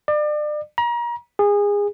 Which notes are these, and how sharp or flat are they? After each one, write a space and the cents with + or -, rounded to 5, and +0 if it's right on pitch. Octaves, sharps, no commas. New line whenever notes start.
D5 +35
A#5 +35
G#4 -25